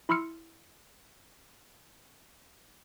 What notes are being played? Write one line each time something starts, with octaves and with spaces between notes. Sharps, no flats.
E4 B5 C6 E6 F6 C#7